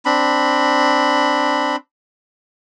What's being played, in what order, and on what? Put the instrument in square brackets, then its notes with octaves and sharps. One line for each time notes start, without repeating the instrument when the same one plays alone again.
[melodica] C4 D4 B5